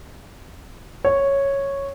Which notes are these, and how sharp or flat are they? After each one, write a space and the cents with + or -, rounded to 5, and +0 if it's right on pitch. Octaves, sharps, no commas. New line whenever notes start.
C#5 -5